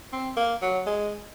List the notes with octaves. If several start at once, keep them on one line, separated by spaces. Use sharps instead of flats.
C4
A#3
F#3
G#3